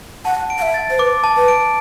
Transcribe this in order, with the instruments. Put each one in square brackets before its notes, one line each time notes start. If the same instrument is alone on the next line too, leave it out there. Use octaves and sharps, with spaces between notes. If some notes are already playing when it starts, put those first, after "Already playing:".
[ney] F#5 [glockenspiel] A5
[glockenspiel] D7
[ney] F#5
E5
[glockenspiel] A6
[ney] C5
[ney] B4 [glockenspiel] D6
[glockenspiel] A5
[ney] B4
[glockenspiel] D7